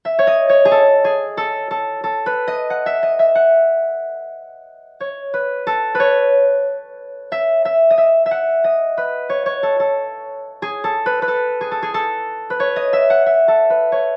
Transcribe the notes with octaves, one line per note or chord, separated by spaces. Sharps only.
E5
C#5
D#5
C#5
G#4
A4
G#4
A4
A4
A4
B4
D#5
F#5
E5
D#5
E5
F#5
C#5
B4
A4
B4
C#5
E5
E5
D#5
E5
E5
F#5
D#5
B4
C#5
C#5
A4
A4
G#4
A4
B4
B4
A4
G#4
A4
G#4
A4
B4
C#5
D#5
E5
F#5
E5
A4
B4
C#5